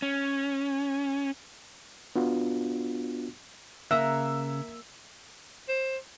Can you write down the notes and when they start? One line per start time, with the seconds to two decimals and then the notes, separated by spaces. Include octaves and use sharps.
0.02 C#4
2.16 B3 D4 F4 F#4
3.91 C#3 A#3 E5 A#5 E6 F#6
5.68 C5